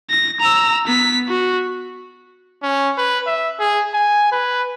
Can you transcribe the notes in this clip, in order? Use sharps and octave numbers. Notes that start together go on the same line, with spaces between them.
A#6
A#5 E6
B3 B6
F#4
C#4
B4
E5
G#4
G#5
B4